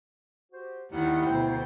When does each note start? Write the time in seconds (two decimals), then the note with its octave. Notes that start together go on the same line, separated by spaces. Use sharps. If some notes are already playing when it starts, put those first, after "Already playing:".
0.52 F#4 G4 C5
0.92 D#2 D#3 G3 E4 F#5
1.26 D2 B2 C5 G5